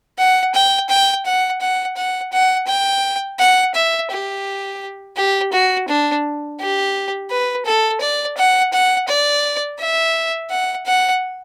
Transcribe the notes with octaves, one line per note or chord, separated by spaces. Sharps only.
F#5
G5
G5
F#5
F#5
F#5
F#5
G5
F#5
E5
G4
G4
F#4
D4
G4
B4
A4
D5
F#5
F#5
D5
E5
F#5
F#5